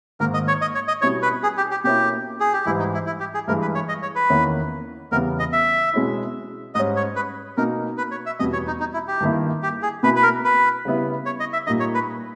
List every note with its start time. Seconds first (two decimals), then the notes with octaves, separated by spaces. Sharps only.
0.20 G#2 D#3 A#3 A#4
0.34 D#5
0.48 C#5
0.61 D#5
0.75 C#5
0.88 D#5
1.01 B2 G3 C#4 E4 C#5
1.22 B4
1.43 G#4
1.57 G4
1.71 G4
1.84 B2 A#3 C#4 E4 G4
2.40 G#4
2.53 G4
2.66 G#2 E3 G3 E4
2.79 D#4
2.94 E4
3.06 E4
3.20 G4
3.34 G#4
3.48 G2 E3 G#3 A#4
3.61 B4
3.75 C#5
3.89 D#5
4.02 C#5
4.15 B4
4.30 E2 D#3 A#3 C#4 E4
5.12 E2 C#3 E3 G3 B3 A#4
5.39 D#5
5.52 E5
5.93 B2 G#3 C#4 E4
6.75 G#2 G3 C#4 D#5
6.96 C#5
7.16 B4
7.57 B2 A#3 D#4 A#4
7.98 B4
8.11 C#5
8.26 E5
8.39 E2 B2 G3 D#5
8.53 C#5
8.67 D#4
8.80 D#4
8.94 E4
9.08 G4
9.21 G2 D#3 A#3 E4
9.63 G4
9.82 G#4
10.03 B2 A#3 E4 B4
10.16 B4
10.23 A#4
10.44 B4
10.85 C#3 G3 B3 E4
11.26 C#5
11.40 D#5
11.53 E5
11.67 A#2 G3 A#3 D#4 D#5
11.80 C#5
11.94 B4